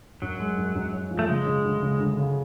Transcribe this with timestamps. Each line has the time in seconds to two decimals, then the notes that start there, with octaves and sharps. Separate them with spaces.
0.22 F#2 F#3
0.40 G#3
0.58 F#2
0.75 F#2
0.93 C#4
1.11 F3
1.19 A3
1.28 C#3 G#3
1.46 C#3
1.64 D2
1.82 C#3
1.99 D2
2.17 C#3